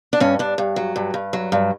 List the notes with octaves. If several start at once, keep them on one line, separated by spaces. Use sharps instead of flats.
D4
G2 C#4
G2 D4
G2
F#3
G2
G2
F#3
G2